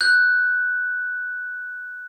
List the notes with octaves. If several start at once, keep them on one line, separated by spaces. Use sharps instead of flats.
F#6 G6